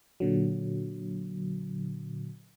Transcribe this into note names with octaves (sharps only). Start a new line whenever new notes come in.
A#2 D3 F#3